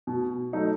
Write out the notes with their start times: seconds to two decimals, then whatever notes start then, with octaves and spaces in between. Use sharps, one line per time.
0.07 B2
0.53 F#3 A3 D#4